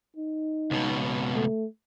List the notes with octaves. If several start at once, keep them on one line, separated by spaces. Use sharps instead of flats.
D#4
C#2 B2
A3